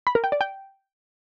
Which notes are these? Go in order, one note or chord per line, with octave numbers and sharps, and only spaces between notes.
B5
A#4
G5
D5
G5